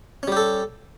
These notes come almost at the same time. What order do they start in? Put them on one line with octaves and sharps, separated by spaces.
C#4 G3 G4 A4